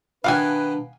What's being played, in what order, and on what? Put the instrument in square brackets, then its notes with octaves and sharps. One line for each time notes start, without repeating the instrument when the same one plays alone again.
[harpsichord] B2 D#3 [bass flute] D4 [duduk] B4 [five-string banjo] F5 F#5 G#5